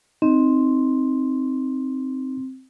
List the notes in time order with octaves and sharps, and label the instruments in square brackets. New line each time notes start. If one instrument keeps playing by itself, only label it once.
[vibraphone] C4 [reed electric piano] D#4